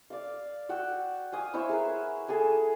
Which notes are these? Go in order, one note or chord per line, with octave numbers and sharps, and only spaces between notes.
D5 F5
F#4 F#5 G5 E6
F5 G#5 D#6
E4 C5 C#5 E5
G#4 A#4 B4
G#4 A4 G#5